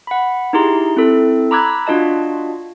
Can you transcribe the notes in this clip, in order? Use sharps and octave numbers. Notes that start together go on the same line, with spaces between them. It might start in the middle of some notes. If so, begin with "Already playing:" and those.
F#5 B5
D#4 E4 G4 G#4 A#5 C6
C4 E4 A4
A#5 B5 D6 E6 F#6 G#6
D4 F4 F#4 D#5 A5